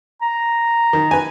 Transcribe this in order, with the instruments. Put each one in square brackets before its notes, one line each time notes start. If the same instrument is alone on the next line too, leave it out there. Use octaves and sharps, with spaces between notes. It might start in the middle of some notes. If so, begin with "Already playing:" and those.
[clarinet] A#5
[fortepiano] D#3
B4 G#5